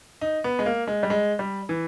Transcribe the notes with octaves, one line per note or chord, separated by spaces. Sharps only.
D#4
B3
G#3
A#3
G#3
G3
G#3
G3
E3